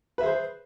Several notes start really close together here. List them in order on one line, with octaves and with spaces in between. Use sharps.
B4 E5 G#4 C5